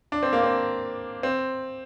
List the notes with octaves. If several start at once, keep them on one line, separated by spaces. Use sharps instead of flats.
D4
C4
A#3
C4
C4